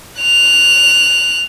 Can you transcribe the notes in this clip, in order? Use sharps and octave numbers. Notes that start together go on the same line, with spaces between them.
F#6 F7